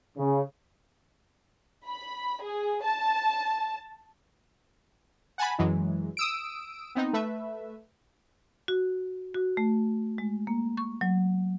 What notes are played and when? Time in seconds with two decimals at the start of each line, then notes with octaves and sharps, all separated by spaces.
0.17 C#3
1.85 B5
2.41 G#4
2.83 A5
5.38 F#5 G#5 A5 B5
5.59 F#2 E3 F#3 G#3
6.17 D#6 E6 D7
6.95 B3 C4 D#4
7.13 A3 B4 E5
8.68 F#4
9.34 F#4
9.57 A3
10.18 G#3
10.47 A#3
10.77 C#6
11.01 F#3